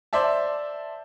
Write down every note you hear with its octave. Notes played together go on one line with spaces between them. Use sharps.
C5 D5 E5 A5